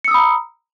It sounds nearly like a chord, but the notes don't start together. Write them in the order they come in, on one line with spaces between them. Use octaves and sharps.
C#7 E6 D#6 B5 A#5